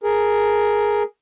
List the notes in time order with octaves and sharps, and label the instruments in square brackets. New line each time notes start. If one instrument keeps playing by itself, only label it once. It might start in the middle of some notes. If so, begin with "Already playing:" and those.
[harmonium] G#4 A#4